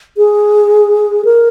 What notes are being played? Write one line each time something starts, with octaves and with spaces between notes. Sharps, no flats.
G#4
A#4